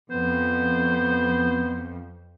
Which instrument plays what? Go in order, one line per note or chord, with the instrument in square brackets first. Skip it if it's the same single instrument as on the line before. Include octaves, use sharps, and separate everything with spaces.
[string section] F2 [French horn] B3 [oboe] C5